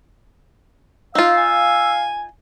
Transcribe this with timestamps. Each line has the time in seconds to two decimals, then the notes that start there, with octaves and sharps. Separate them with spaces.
1.15 D#4 F4 F5 E6
1.37 G#5